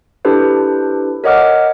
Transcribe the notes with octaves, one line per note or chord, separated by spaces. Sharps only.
D4 E4 G4 A4 B4 C5
A#4 C#5 D#5 F#5 D6 F6